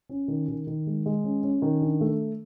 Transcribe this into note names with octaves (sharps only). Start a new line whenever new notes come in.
C#4
D#3
D#3
D#3
G#3
G#3
C#4
C#4
D#3
D4
A3